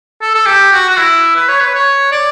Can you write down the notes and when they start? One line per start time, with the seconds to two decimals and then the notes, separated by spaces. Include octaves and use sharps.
0.22 A4
0.35 A4
0.46 G4
0.73 F#4
0.89 F#4
0.97 E4
1.36 B4
1.48 C#5
1.60 B4
1.75 C#5
2.12 D5